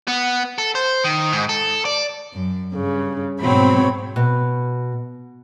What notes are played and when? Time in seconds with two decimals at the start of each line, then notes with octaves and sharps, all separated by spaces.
0.08 B3
0.58 A4
0.75 C5
1.04 D#3
1.33 G#2
1.49 A4
1.85 D5
2.33 F#2
2.72 G2 C#3
3.41 G#2 B2 F#3 C4 C#5 B5
4.16 B2